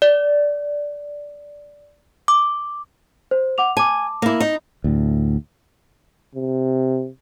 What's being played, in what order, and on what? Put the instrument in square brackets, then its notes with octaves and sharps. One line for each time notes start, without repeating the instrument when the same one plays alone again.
[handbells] D5
D6
[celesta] C5
F#5 D6 F7
[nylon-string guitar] G#5 [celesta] A5 D6
[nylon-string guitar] A#3 E4
D#4
[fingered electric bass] D2 A2
[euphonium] C3